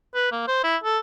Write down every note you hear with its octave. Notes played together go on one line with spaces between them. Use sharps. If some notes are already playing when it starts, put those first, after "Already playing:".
B4
A#3
C5
E4
A4